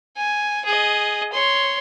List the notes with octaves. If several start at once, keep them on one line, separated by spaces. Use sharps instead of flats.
G#5
G#4 D#5
C#5 C6